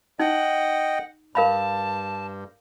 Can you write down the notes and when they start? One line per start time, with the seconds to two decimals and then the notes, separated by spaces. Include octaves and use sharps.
0.19 D#4 D#5 F#5 G5
1.35 G2 A#4 F5 A5 B5